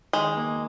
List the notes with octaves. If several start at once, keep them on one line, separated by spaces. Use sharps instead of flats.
D#3 G#3
A#3